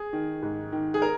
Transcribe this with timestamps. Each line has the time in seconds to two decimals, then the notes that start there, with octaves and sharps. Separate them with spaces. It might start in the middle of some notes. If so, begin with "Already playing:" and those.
Already playing: G#4
0.13 D#3
0.43 G#2
0.72 D#3
0.94 G#4
1.02 A#4